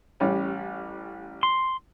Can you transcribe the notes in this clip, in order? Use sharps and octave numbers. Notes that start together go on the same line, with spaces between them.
A1 G3 C#4
C6